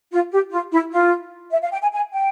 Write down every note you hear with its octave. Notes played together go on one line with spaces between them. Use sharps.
F4
G4
F4
E4
F4
E5
F5
G5
G#5
G#5
G5